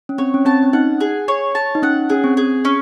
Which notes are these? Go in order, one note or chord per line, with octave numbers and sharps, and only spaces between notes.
C#4
C4 C#5
C#4
C4 A5
C#4
D#4 F#5
G#4
C#5
A5
D#4
C#4 F#5
C#4 G#4
C4
G#4
C#4